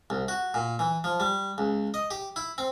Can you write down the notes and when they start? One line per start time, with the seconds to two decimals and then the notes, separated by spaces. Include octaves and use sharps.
0.10 C2
0.28 F#4
0.54 A#2
0.79 E3
1.04 F3
1.20 G3
1.58 C#2
1.94 D#5
2.11 G4
2.36 E4
2.58 C4